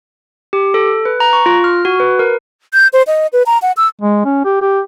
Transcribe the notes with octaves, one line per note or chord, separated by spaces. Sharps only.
G4
A4
B4
A#5
C#6
F4
F6
F#4
B4
A#4
G6
C5
D#5
B4
A#5
F#5
E6
G#3
C#4
G4
G4